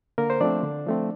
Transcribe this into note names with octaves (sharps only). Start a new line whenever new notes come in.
D3 A#3 A#4
C5
F3 A3 C4 D4 D5
D3
F3 A3 C4